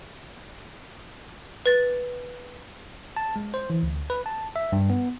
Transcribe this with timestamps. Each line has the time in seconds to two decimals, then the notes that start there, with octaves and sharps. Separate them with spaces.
1.66 B4 A6
3.17 A5
3.36 G#3
3.54 C5
3.70 E3
3.83 D2
4.10 B4
4.26 A5
4.56 E5
4.72 G2
4.90 B3